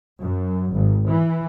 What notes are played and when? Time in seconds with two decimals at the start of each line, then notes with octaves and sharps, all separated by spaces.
0.21 F#2
0.73 G#1
1.08 E3